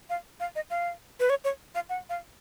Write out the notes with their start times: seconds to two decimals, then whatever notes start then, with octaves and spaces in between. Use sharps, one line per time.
0.10 F5
0.40 F5
0.56 D#5
0.70 F5
1.20 B4
1.30 C#5
1.44 C#5
1.75 F5
1.89 F#5
2.09 F5